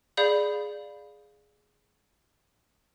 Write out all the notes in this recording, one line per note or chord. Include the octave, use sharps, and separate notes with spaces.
G#4 D5 F5 B5 G6